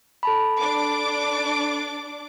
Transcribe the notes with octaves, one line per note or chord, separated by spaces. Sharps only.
A4 A5 B5
D4 D6